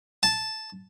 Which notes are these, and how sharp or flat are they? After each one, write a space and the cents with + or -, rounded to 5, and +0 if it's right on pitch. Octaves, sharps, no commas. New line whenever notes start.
A5 -5